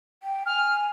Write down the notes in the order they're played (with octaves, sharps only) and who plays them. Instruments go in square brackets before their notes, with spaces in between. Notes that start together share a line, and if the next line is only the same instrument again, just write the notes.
[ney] G5
[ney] G#5 [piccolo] F6